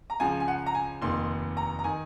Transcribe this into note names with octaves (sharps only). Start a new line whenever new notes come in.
A#5
C#2 C#3 F3 G#5
G#5
F#5
A#5
G#5
F1 D#2 D#3 C6
A#5
A#5
D#3 G#5